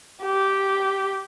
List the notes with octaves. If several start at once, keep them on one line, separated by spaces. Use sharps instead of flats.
G4